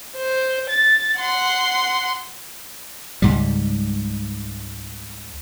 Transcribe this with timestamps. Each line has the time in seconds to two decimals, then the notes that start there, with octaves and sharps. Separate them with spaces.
0.16 C5
0.69 A6
1.18 F#5 C6
3.22 C#2 G#2 G3